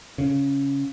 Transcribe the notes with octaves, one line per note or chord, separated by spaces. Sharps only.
C#3